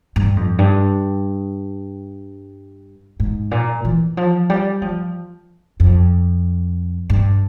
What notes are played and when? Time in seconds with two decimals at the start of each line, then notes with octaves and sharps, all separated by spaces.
0.16 G2
0.36 F2
0.59 G2
3.20 G#2
3.51 A#2
3.85 E3
4.17 F3
4.50 G3
4.82 F3
5.80 F2
7.10 G2